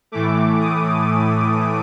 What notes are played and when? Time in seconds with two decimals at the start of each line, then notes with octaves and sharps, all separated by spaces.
0.12 A2 E3 A3 D6
0.60 D#6